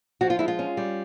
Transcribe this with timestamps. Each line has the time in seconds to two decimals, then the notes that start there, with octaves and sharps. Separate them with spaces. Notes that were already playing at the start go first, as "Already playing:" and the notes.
0.21 F3 F#4
0.30 F4
0.39 G#3 E4
0.48 F4
0.59 C#4
0.77 G3